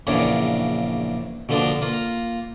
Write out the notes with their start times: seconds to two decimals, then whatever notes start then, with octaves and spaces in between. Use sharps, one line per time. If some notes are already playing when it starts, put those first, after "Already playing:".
0.07 A#1 E2 C#3 A#3 D4 C#5
1.49 B2 D3 F3 A#3 D4
1.82 A#3 F4